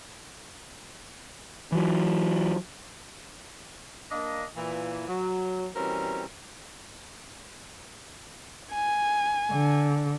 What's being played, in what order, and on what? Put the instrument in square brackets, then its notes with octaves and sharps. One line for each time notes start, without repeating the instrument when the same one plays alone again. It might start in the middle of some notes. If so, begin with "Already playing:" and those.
[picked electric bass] E3 F#3
[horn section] A#3 D4 D#5
A#2 E3
F#3
B2 E3 G3 C4 C#4 A#4
[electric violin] G#5
[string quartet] D3